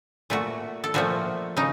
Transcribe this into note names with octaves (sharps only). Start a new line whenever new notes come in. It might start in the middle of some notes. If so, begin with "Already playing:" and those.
A#2 A3 F#4
A4
A#2 F3 A3 F#4
C#3 D#4